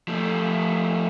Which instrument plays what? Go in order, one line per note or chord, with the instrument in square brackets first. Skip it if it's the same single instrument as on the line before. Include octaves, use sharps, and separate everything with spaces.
[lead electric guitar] F3 A3